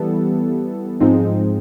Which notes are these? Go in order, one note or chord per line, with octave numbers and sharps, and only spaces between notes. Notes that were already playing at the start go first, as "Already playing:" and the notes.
Already playing: E3 G3 B3 E4 A4
G#2 F3 G#3 C4 D#4